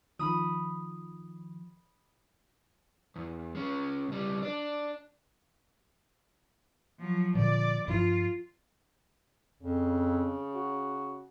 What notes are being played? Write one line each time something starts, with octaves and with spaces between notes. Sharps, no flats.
D#3 F3 B5 D#6
E2
G#3 C#4
C#2 G3
D4 D5
F3 F#3
A#2 D3 F3 D5
G2 F3 F4
F2 C#3
F#4